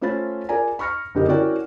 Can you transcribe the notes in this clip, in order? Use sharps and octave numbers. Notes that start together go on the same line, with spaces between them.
A3 C#4 F4 C5 B5 A6
F4 G#4 A#4 D5 G#5 A#5
B5 C#6 F6 A#6 C#7
F#1 D3 G4 A#4 D#5
C#4 E4 F#4 A#4 D5 G5